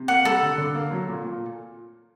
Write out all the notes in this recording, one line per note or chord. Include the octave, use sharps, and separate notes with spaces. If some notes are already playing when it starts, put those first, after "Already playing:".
Already playing: C3
A#3 F#5
G3 A4
D3
D3
A#3
F#3
A#2
A#2